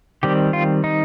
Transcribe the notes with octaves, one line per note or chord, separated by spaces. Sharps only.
D#3 G3 C4 G4
F4
D#4